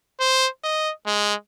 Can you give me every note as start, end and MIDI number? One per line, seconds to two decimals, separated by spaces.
0.20 0.48 72
0.64 0.91 75
1.07 1.34 56